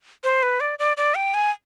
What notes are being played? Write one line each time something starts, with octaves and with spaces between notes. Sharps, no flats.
C5
B4
D5
D5
D5
G5
G#5